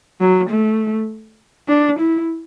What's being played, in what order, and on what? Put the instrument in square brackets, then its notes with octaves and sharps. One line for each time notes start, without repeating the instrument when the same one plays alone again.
[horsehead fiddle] F#3
A3
D4
E4